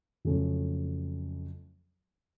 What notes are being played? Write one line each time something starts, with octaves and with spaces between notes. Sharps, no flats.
F2 C#3 F#3 A3 C#4